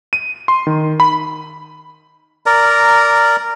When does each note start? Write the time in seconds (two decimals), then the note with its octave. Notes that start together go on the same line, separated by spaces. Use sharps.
0.13 D#7
0.48 C6
0.67 D#3
1.00 B5
2.46 A#4 D5 A#5